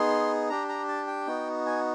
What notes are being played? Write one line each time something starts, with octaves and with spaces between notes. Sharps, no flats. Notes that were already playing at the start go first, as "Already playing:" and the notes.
Already playing: B3 D#4 G#4 C6
D4 G4 A#5
A#5
A5
G5
B3 D#4 F#4
G#5